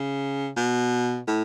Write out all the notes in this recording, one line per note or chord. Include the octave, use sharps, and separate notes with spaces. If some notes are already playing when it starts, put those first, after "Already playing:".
Already playing: C#3
B2
A2